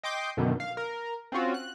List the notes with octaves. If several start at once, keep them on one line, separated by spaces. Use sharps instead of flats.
D#5 G5 C6 D6 G6
F#2 B2 D3 D#3
F5
A#4
C4 C#4 F4 F#4
F#6